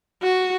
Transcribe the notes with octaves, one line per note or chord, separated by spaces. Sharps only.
F#4